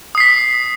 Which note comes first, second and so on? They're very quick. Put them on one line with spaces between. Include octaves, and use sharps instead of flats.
D#6 C7 B6